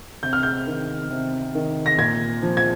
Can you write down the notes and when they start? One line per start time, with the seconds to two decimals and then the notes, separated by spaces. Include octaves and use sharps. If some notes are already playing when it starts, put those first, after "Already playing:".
0.23 C3 G6
0.33 F6
0.43 G6
0.67 D#3
1.10 C3
1.55 D#3
1.86 A#6
1.98 A#2 G#6
2.42 F3
2.57 G#6